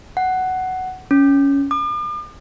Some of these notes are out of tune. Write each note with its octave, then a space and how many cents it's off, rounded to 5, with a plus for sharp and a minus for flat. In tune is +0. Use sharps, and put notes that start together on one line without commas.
F#5 +10
C#4 +10
D6 +45